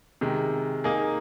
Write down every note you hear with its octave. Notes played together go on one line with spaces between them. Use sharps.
C3 D#3 G#3
A#3 D#4 G#4